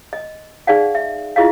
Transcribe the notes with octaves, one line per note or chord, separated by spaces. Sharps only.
D#5
D#4 G#4 D5 F5 F#5
E5
E4 F4 G#4 D#5 F5